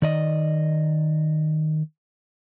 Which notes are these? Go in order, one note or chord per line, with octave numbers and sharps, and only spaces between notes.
D#3 D5 D#5